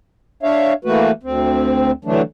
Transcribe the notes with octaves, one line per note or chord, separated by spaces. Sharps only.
D4 C#5 E5 F5
E3 A3 A#3 F#4 B4
D2 C4
D3 E3 F#3 A3 D4